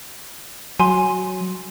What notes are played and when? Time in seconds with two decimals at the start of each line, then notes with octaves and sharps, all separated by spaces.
0.80 F#3 G#5 C6